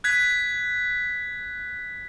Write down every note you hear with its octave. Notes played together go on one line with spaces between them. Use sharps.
F#6 G#6 B6